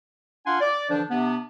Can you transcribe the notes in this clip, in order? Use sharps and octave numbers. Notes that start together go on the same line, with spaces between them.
D4 F4 F5 F#5 G#5 C6
D5
D3 E3 F3 D4
C3 B3 D4